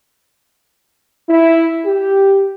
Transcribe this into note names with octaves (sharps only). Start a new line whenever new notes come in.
E4
G4